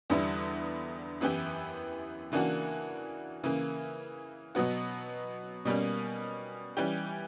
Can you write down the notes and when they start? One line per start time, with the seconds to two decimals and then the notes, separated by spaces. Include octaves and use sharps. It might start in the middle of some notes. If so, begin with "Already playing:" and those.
0.10 E2 D3 G3 B3 E4
1.21 F#2 E3 B3 E4 G4
2.32 C#3 E3 A#3 D4 F#4
3.43 C#3 E3 A#3
4.55 B2 F#3 B3 F#4
5.65 B2 G3 A#3 C#4
6.77 E3 G3 C#4 G4